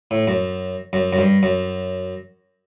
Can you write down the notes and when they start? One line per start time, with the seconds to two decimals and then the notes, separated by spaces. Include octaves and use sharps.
0.11 A2
0.28 F#2
0.93 F#2
1.13 F#2
1.18 G2
1.43 F#2